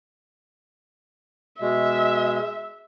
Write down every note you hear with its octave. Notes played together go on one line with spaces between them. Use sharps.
B2 G#3 E5